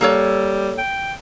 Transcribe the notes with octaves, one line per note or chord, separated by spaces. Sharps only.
G3 A#3 A4 C#5
G5